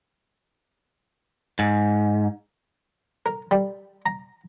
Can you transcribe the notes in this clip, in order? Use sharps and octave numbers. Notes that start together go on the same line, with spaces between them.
G#2
A#4
G3
A#5